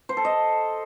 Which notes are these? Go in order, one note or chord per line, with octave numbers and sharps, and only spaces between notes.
C5
A4
D#5